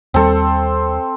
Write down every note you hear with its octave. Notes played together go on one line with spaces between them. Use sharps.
D#2 G3 C4 A4